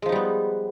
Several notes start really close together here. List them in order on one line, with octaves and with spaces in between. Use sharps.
G#3 F3 D#4 G3 B3